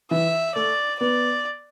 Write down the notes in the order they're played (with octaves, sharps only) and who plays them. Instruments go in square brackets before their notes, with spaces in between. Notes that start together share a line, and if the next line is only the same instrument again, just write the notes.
[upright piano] E3 [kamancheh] E5
[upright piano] A3 [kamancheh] D5
[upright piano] B3 [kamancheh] D5